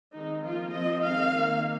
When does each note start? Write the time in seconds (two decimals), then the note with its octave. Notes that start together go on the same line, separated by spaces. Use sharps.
0.16 D#3 G#3 C4 D#4
0.45 F3 A#3 F4
0.75 F3 C4 D#5
1.04 D#3 G#3 C4 F5
1.34 D#3 A#3